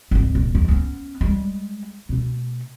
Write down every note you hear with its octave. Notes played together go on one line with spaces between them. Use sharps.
G#1 C#2
D#1
E2 D#3
B3 C#4
G3 G#3
B2 A3